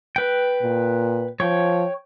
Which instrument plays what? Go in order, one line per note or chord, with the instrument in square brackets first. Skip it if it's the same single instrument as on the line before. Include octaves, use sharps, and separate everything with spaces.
[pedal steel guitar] B4 G5
[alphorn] A#2
[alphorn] F3 [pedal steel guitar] C#5 G5